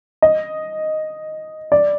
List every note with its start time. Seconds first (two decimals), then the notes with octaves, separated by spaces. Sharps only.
0.22 D#5
1.72 D5